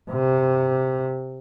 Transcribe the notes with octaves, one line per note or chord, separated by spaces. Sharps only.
C3